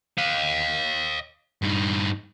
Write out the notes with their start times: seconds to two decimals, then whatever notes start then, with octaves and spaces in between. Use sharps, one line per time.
0.18 D#5 F5
1.63 G2 D#4